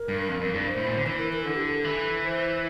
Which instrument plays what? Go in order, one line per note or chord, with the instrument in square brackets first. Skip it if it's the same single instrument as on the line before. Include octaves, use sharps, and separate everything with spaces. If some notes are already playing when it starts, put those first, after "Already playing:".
Already playing: [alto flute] A#4
[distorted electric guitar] G2
F2
F2
G2
[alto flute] C5
[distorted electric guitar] A2
A#2
D3
[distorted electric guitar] E3 [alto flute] C5
[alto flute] A#4
A#4
[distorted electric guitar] D3 [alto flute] A4
[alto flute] G4
A4
[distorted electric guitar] E3
[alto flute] C5